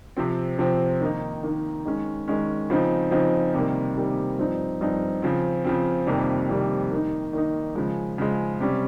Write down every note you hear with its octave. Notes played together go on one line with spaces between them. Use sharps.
C3 F3 C4
C3 F3 C4
D#3 A#3 D#4
D#3 A#3 D#4
D#3 G#3 C#4
D#3 G#3 C#4
C#3 F3 C4 D#4
C#3 F3 C4 D#4
C3 D#3 G3 A#3
C3 D#3 G3 A#3
G2 F3 C4 D#4
G2 F3 C4 D#4
C#3 F3 C4
C#3 F3 C4
F2 C3 D#3 G3 A#3
F2 C3 D#3 G3 A#3
D#3 A#3 D#4
D#3 A#3 D#4
C#3 F3 G#3
C#3 F3 G#3
C3 G3 C#4